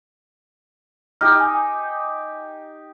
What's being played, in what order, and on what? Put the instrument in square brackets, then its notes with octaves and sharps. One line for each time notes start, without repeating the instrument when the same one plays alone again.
[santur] D#4 G4 [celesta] F6
[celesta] G#5